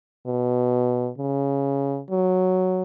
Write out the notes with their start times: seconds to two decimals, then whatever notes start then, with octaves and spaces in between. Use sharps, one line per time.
0.26 B2
1.18 C#3
2.10 F#3